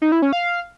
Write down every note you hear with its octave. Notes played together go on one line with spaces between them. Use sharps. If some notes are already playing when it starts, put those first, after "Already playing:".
D#4
E4
C#4
F5